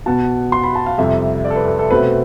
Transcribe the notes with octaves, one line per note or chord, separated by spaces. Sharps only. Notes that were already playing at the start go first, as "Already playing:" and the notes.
B2 B3 A5
C6
B5
A5
F5
F2 C3 G3 E5
D5
A4
B4
A4
A4
B2 A3 C4 B4